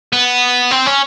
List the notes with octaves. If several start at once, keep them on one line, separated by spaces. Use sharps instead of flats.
B3
C4
C#4